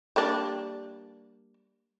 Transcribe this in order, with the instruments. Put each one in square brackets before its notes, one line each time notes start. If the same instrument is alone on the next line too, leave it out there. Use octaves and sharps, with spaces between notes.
[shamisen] G3 A#3 D4